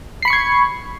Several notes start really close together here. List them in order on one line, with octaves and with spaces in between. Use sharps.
C7 B5 C#7 C#6 G#6